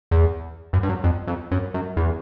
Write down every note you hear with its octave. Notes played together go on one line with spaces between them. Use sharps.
E2
F#2
G2
F#2
F2
F2
F#2
F#2
E2